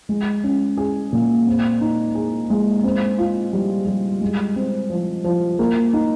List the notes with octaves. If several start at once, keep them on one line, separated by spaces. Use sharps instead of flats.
G#3
C#4
G#4
A#2
C4
D#4
G#4
G#3
C4
F4
G3
G3
G#3
C4
F3
F3
A#3
D#4